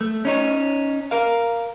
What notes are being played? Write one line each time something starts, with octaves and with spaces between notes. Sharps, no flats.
A3
C#4 D#4 C#5
A#4 F5